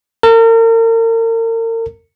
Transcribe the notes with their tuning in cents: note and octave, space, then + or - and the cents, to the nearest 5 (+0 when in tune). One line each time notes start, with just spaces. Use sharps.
A#4 -40